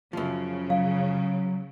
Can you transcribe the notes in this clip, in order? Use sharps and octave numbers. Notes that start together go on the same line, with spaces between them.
F#2 C#3 F3
F#3 F5